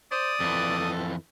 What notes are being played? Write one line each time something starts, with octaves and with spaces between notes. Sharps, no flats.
C5 D5 D#6
F2 E3 A4